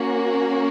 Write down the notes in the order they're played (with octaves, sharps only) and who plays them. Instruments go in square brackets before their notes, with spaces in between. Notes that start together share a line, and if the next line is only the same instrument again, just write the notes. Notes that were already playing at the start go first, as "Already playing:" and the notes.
Already playing: [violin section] A#3 C#4 F#4